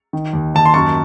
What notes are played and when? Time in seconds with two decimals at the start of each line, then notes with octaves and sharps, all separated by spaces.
0.13 D#3
0.33 D#2
0.55 D#2 A5
0.66 C6
0.74 F#2 A5 C#6